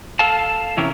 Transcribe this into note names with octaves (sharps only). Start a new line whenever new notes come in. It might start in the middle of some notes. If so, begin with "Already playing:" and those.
A4 F5 A5
C3 E3 C#4 E4 G4 A#4